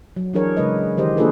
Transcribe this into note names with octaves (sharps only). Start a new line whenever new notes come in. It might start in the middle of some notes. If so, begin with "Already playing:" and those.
F#3
E3 F#3 D4 G#4 A#4 C#5
C#3 G#3 B4 D#5
D#3 E3 G4 C5 D#5
A#3 D4 F4 G#4 A4 B4